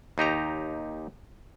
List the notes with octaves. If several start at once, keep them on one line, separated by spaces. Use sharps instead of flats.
D#2 D#4 G4 A#5